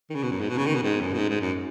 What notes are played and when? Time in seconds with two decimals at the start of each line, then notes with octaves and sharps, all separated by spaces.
0.10 D#3
0.15 C#3
0.23 B2
0.31 F#2
0.41 G#2
0.49 B2
0.57 C#3
0.66 D#3
0.75 B2
0.83 G#2
1.01 F#2
1.13 B2
1.18 G#2
1.29 G#2
1.40 F#2